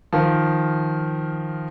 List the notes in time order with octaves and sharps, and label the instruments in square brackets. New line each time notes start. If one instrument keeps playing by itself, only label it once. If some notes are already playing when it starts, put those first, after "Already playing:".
[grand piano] D#3 F3